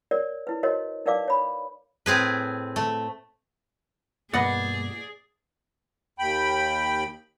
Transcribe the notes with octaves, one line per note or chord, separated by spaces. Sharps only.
A#4 C#5 D5
E4 B4
F#4 A#4 C5 C#5 D#5
D#4 A#4 B4 D5 F5 D6
C#5 B5
A2 C4 G#4 B4
A3
G2 B2 A#3 G#4 B4 D5 D#5 F#5
D#2 G5 B5